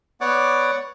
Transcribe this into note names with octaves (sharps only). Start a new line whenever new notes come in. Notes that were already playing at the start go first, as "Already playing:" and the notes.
B3 C#5 D5 F#5 D6